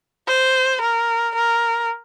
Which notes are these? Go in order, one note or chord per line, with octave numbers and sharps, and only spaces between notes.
C5
A#4
A#4